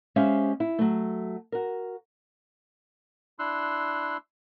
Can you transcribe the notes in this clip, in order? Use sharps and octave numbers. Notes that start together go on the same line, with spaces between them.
G#3 C#4 G4 C5 E5 F5
E4
F#3 A3
F#4 A#4
D4 E4 C6 E6 F#6